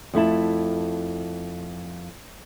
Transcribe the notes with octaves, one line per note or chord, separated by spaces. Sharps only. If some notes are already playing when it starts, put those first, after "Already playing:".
F2 A3 E4 A5